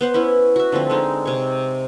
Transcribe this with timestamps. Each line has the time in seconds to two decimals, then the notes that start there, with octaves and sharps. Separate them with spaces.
0.01 B3 C5 F#5
0.14 B3 C#4 E4
0.56 F#4 E5
0.72 D3 F3 A3 C4
0.90 D3 G#3 D#4
1.25 C3 C#5